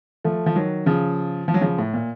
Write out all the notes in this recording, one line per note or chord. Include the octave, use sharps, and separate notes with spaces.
F3 A3
F3
D#3 F#3
C#3 F3
F3
F#3
C#3 F3
A2
A#2